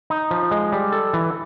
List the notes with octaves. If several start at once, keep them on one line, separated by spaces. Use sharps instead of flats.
D#4
F3
G#3
G3
A4
E3